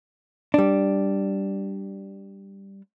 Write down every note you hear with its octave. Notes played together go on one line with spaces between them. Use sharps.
G3 D4